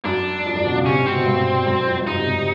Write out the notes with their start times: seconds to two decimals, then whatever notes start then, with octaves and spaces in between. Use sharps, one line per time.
0.05 F#2 D4
0.46 F2
0.55 F#2
0.66 B2
0.76 C#3
0.86 C3 C#4
0.96 C3
1.06 B2 C4
1.16 B2
1.26 G2
1.66 F#2
1.87 F2
2.01 G2
2.07 F#2 D#4
2.17 C3
2.27 C3
2.37 C3